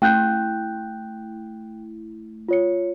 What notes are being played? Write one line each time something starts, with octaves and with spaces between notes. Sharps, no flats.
A3 E4 G5 F#6 G6
F4 C#5 C#7